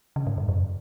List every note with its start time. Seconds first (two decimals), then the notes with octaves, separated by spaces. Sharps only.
0.16 C#3
0.27 G#2
0.38 G2
0.49 F#2